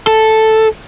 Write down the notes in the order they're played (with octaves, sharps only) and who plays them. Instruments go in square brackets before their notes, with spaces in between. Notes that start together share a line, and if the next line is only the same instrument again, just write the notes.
[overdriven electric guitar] A4